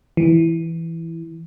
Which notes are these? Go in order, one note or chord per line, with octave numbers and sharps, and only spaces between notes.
E3